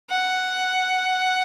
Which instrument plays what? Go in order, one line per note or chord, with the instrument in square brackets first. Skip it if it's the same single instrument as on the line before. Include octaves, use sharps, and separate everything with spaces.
[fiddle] F#5